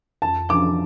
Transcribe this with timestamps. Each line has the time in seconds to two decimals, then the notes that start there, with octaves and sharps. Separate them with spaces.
0.22 F2 A5
0.49 F3 D4 D6